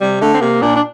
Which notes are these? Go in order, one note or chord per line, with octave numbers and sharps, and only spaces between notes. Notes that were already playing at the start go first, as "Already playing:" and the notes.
C3 G3
D3 A3
C4
C3 A#3
A#2 D4
D4